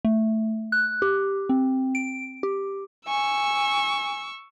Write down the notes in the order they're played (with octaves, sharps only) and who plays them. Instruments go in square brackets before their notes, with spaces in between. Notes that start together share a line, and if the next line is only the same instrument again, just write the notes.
[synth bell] A3
F#6
G4
C4
D7
G4
[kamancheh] G#5 [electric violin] C#6 E6